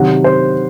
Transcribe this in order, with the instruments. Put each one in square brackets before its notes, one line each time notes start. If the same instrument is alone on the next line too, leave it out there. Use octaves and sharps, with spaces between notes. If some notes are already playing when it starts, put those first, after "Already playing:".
Already playing: [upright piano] C3 D#3 F#3 F#5
C5